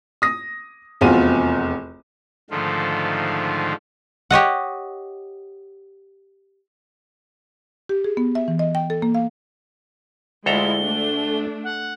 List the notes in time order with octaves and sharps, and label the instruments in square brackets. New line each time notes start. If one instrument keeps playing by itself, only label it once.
[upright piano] D#6 A#6
F1 E2 C4 F4 F#4 D#7
[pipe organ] G#2 D3 D#3 F3 A3 F4
[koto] G4 C#5 D#5 F#5
[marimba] G4
G#4
B3
E5
E3
D#5
G5
A4
A#3
F5
[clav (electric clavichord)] D2 A4 A#5 [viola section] G#3 E4 F4 [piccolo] G7
[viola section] A3 D4
[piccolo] F#5